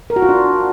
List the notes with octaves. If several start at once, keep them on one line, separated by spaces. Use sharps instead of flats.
A#4
F#4
F4
D4